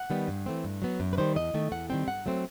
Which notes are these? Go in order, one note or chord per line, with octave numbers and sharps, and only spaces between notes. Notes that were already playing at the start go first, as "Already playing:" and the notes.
Already playing: F#5
D#3 G3 B3
G2
E3 A3 C4
G2
F#3 B3
F#2
B4
D#3 G3 C5
E2 D#5
D#3 A3
E2 F#5
D#3 G3 C4 G5
G2 F#5
F#3 A3 C4